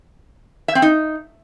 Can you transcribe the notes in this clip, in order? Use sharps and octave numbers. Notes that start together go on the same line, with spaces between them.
E5
C4
D#4